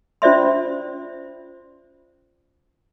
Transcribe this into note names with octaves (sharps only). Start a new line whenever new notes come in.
C#4 F4 C5 D5 E5 C6